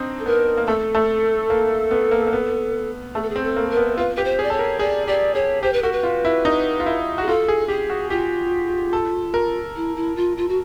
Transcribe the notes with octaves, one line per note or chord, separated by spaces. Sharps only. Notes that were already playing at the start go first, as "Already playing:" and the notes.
Already playing: C4 D4 D#4
A4
B3 A#4
A#3
A3 A4
A3
A#3
B3
A#3
A#3
B3
A3 G#4
A4
G#4
C4
A4
A#3
A#4
B3
F4 B4
G4 B4
C5
G#4
D5
A4 C#5
A#4
G#4 D5
G4 D5
G#4 C#5
G4 C5
B4
F#4 A#4
B4
F4
E4
D#4
F4
E4
F#4 G#4
F4 A4
G#4
G4 G#4
F#4
F4 G4
A4
A#4
E4
E4
F4
F4
F#4